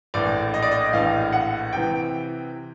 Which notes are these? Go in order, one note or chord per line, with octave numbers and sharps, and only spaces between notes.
A#1 A2 E3 D5
D#5
D5
D#5
A#1 A2 E3 F5
F#5
C3 E3 G5